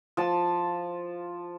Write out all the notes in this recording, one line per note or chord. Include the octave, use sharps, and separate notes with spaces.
F3 A5